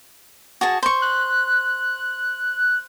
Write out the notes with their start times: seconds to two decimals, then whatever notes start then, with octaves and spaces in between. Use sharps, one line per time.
0.61 F#4 G#4 A5
0.83 C5 C#6
1.02 F#6